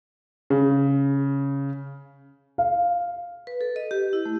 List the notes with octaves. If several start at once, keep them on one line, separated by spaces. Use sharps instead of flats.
C#3
F5
B4
A4
D#5
G4
E4
A3